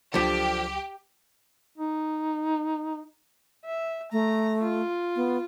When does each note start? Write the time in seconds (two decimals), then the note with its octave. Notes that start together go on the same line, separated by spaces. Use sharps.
0.14 C#2 D3 F3 F#3 G4 D6 B6
1.78 D#4
3.65 E5
4.12 A3 A#5
4.62 F4
5.16 B3